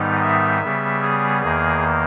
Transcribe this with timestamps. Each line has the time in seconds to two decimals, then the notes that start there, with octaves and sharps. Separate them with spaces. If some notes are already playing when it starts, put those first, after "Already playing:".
Already playing: G#2 D#3 G3 B3 D#4
0.22 E5
0.63 C#3 G3 B3
1.02 G#4
1.42 E2 D#3 A#3 G#4